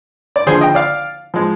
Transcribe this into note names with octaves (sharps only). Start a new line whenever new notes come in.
D5
D#2 D3 F3 G#4 C5
D#5 G5
D5 F5
F3 G#3